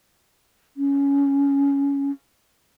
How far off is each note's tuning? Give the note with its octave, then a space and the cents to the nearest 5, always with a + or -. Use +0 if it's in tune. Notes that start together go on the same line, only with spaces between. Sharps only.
C#4 +15